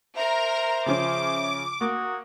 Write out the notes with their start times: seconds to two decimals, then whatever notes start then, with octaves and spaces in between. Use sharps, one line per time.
0.16 A#4 C5 E5 A#5
0.86 C#3 F3 C#4 D6
1.81 A#3 F#4 D#6